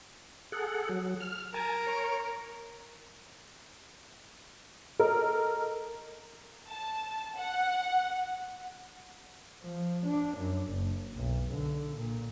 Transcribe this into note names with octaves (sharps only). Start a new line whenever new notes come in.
G#4 A4 F#5
F#3
F6
A#4 G#5 A5
C#5
A4 A#4 D#5
A5
F#5
F3
D4
F#2
F#1
B1
D3
A#2